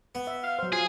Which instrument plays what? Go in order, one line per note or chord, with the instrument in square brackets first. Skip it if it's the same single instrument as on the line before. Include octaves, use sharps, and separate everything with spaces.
[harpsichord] B3
[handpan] E5
[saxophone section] F5
[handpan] F#3 C5
[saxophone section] F4 [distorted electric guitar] G#4